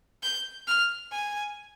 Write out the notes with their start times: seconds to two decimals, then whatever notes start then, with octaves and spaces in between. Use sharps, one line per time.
0.23 G6
0.68 F6
1.12 G#5